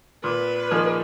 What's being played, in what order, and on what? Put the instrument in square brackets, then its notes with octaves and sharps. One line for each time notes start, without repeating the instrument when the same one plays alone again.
[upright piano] A#2 [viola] B4
[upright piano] F3 A#3 D#4 G#4